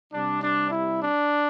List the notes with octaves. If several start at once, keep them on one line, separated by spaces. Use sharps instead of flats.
C3 G3 D4
D4
E4
D4